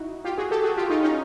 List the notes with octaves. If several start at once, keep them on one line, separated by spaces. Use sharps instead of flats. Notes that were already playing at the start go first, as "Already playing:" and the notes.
Already playing: D#4 E4 F#4
F4 G4
F#4 G#4
G4 A4
F#4 G#4
F4 G4
D#4 F4
C#4 D#4